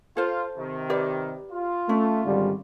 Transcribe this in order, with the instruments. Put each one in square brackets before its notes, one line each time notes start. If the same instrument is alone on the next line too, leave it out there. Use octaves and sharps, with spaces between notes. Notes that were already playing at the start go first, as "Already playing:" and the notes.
[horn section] F4 [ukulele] A4 C5
[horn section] C3 D#3
[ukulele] G4 B4 D5
[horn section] F4
[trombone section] A3 [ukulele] C#4
[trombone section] G#1 D3 G3